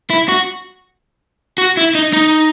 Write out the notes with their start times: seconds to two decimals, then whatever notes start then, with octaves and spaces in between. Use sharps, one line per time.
0.10 E4
0.28 F#4
1.58 F#4
1.77 E4
1.95 D#4
2.13 D#4